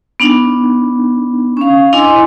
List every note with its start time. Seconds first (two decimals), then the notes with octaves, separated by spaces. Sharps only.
0.20 B3 D4 D#4
1.57 C#4 F5
1.93 D4 E4 D#5 G#5 C6